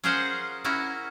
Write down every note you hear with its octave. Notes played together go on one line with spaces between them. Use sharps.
C#4 F4 G#4 A#4 C5 F#5
C#4 E4 F#4 A#4